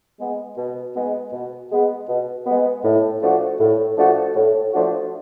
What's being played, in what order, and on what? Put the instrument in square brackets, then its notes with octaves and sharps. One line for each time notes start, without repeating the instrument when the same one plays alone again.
[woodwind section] G#3 B3
B2
G#3 B3
B2
G#3 B3
B2
G#3 B3
A2
F3 A3 D4 F#4
A2
F3 A3 D4 F#4
A2
F3 A3 D4 F#4